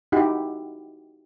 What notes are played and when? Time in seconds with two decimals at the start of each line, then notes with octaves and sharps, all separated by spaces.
0.12 D#4 E4 F#4 G4 F#5